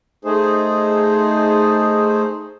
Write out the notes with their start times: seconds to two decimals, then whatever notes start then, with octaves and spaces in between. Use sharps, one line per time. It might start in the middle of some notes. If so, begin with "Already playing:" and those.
0.25 A3 D#4 G#4 C5